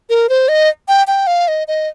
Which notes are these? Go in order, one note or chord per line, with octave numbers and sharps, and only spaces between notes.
A#4
C5
D#5
G5
G5
F5
D#5
D#5